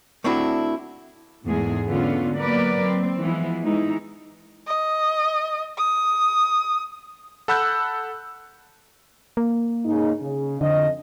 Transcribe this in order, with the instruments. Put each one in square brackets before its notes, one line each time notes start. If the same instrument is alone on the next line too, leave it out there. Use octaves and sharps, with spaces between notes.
[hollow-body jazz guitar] A3 C4 D4 E4 F#4
[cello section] E2 G#2 G#3 A3 G#4
D3 A3 B3 C#4 F4
F#3 A#3 B3 A#4 B4 D5
C4
E3 F3 G#3 B3 E4
E3 G#3 D#4 E4
[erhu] D#5
D#6
[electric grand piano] A4 F#5 B5 E6 F#6 G6
[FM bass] A#3
[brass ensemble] G#2 C#3 D#4
C#3
[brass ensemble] F2 D#5 [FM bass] D3